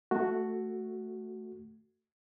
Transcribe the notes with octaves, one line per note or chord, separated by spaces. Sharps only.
A3 F#4